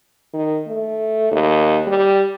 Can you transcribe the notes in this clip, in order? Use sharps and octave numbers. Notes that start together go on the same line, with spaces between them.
D#3
A3
D#2
G3